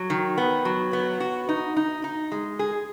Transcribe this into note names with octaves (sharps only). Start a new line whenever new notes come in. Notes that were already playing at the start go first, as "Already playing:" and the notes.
Already playing: F#3
D#3
B3
F#3
B3
F#4
D#4
D#4
D#4
G#3
G#4